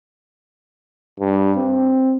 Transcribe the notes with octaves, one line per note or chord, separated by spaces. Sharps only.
G2
C4